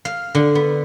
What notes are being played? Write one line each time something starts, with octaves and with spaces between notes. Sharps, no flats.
F5
D3
B3